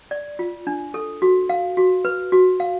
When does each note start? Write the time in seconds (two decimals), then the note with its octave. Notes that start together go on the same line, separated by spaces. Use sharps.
0.11 D5
0.39 F4
0.67 D4
0.94 A4
1.22 F#4
1.49 F5
1.77 F#4
2.05 B4
2.32 F#4
2.60 F5